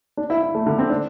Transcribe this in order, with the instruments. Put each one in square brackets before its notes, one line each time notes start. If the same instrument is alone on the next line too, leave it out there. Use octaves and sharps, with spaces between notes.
[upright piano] D4
E4
E4
A3
D3
C4
D4